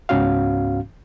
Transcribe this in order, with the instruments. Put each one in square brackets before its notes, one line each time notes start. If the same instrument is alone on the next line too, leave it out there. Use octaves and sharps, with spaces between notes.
[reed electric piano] C#2 G#2 B3 C#4 F#4 F5